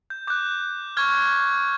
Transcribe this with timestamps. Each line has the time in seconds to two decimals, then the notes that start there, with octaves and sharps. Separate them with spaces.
0.10 G6
0.27 D6 F#6 G6
0.97 C#6 F6 G#6